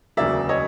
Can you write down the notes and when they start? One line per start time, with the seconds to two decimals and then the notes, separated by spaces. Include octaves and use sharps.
0.17 E1 D2 C#3 F#3 A#3 D5 E5
0.49 C#5 D#5